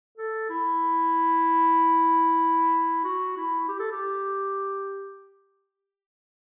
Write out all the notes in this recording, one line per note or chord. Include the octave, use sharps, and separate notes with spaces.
A4
E4
F#4
E4
G4
A4
G4